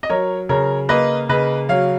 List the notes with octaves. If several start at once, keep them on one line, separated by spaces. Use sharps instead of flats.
D#5
F#3 A#4 C#5
C#3 A#4 C#5
A#3 B4 D#5
C#3 B4 D#5
F#3 C#5 F5